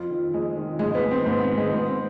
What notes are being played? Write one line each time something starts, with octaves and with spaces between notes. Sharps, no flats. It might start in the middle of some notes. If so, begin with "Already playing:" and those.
Already playing: F2 F4
D#3
F2 G#3
D#3
G#2 G#3
G#3
B3
D#3
C4
G#2 B3
D#3
G#3
G#2 B3
C4